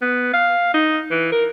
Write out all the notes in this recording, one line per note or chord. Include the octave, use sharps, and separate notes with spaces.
B3
F5
D#4
E3
A#4